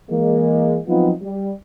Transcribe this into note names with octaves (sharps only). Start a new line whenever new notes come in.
E3 G#3 A#3
F3 F#3 B3 C4 D#4 F4
G3